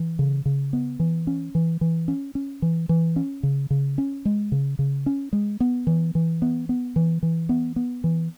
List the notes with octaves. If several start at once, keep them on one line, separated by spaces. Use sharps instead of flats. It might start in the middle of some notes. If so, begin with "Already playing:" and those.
Already playing: E3
C#3
C#3
B3
E3
C#4
E3
E3
C#4
C#4
E3
E3
C#4
C#3
C#3
C#4
G#3
C#3
C#3
C#4
G#3
B3
E3
E3
B3
B3
E3
E3
B3
B3
E3